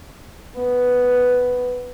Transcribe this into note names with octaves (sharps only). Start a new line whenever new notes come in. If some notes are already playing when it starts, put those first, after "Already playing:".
B3